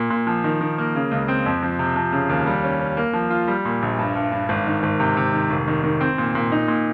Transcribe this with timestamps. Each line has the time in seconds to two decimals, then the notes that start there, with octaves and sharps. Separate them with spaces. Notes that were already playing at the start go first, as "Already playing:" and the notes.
Already playing: A#2
0.10 A#2
0.27 F3
0.44 D#3
0.61 D#3
0.78 A#3
0.95 C#3
1.11 C#2
1.28 C4
1.46 F2
1.63 F3
1.79 C3
1.96 F3
2.12 C#3
2.29 D#2
2.47 G3
2.64 C#4
2.80 C#4
2.97 A#3
3.13 F3
3.30 F4
3.48 G3
3.65 A#2
3.82 A#1
3.99 G2
4.15 G2
4.32 G2
4.49 G#1
4.66 D#3
4.83 G#1
5.00 C3
5.17 C3
5.33 D#3
5.50 F1
5.68 D#3
5.84 D#3
6.01 C4
6.18 A#2
6.35 A#2
6.52 D#4
6.68 A#2